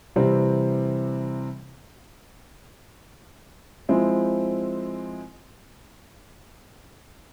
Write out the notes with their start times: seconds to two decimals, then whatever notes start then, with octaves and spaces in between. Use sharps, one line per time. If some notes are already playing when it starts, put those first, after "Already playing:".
0.16 C3 E3 G3 C4
3.89 F3 G#3 C4 E4